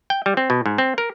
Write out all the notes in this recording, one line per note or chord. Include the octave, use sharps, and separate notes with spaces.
G5
G3
C4
B2
G#2
C4
A#4